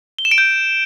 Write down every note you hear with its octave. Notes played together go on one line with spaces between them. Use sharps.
G7
E7
D7
G6